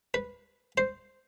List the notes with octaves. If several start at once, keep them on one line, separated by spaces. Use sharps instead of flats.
B4
C5